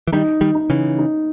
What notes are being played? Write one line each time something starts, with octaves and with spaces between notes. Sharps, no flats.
E3
D#3 G3 D#4
D#3 G3
D#4
C#3 E3
D#4